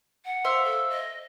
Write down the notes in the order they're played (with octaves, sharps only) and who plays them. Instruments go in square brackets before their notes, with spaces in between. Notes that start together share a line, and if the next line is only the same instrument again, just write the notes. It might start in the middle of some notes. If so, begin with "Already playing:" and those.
[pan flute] F#5
[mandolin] C5 E5 F5
[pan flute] A4
D#5